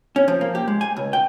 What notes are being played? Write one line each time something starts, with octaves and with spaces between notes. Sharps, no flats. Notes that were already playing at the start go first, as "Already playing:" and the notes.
C#4
F3
A#3
G4
G#3
G#5
C#2
G5